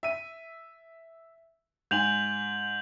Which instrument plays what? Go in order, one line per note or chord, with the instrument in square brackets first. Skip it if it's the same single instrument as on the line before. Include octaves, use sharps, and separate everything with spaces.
[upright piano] E5 D#7
[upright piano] G#2 G#5 [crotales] G6 F7 F#7